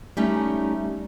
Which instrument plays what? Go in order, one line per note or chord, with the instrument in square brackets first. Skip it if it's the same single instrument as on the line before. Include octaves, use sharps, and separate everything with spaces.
[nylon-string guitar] G3 A3 C#4 D#4